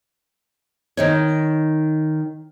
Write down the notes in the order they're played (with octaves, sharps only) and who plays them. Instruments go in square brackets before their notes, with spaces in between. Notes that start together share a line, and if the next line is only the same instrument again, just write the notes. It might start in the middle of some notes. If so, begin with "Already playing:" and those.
[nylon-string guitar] D#3 D#4 C#5